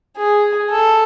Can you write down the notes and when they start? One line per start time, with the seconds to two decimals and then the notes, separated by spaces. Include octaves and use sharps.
0.17 G#4
0.70 A4